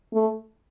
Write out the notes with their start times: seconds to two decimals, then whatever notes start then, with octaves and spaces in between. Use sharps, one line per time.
0.13 A3